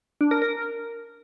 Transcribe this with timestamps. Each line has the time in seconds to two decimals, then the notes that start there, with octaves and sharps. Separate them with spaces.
0.21 D4
0.31 A#4
0.42 A#4